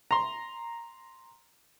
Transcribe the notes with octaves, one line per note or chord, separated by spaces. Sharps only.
A#5 C6